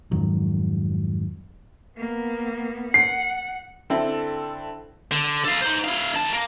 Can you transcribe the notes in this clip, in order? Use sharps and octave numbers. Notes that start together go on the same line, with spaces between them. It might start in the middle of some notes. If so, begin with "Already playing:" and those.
F2 G#2 D#3 F#3
A#3 B3
F#5 C7
D3 C4 E4 A4
D3
A4 F5
D#4 C5
E4 F5
D#3 A5
A#3